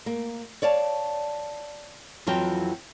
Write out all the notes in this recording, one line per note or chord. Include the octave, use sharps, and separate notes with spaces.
A#3
C#5 D5 F5 A5
F2 E3 F#3 F4 G5